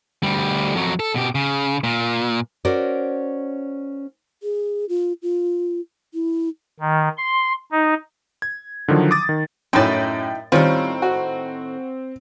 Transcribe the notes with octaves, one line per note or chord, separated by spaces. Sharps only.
D2 G3
F2 F#3
A4
B2 G4
C#3
A#2
C#4 F#4 A#4 C5 D5
G#4
F4
F4
E4
D#3
C6
D#4
G#6
D3 D#3 F3 F#3
D6 D#6 A6
D#3
F#2 A2 C#4 D#4 E4 G5 A6
A2 D#3 G3 C4 C#4 F4
F#4